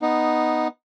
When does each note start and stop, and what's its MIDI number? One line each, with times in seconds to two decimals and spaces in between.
0.02 0.68 59
0.02 0.68 63